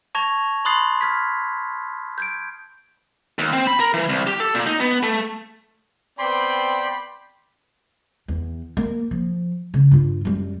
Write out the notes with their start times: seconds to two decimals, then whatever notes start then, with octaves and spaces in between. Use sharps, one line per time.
0.15 A5 C#6 G#6 A#6 F7
0.65 B5 C6 D#6 F#6 A6 C7
1.01 F6 G#6 B6
2.18 G6 G#6 D7
3.39 D#2
3.53 C4
3.67 B5
3.80 A#4
3.94 E3
4.09 C2
4.27 G4
4.40 A4
4.54 A#2
4.67 D#4
4.80 B3
5.03 A3
6.19 B3 C4 D5 G5 B5 C6
8.28 E2
8.77 A#3
9.11 F3
9.74 C#3
9.91 G2 F4
10.25 F#2 G3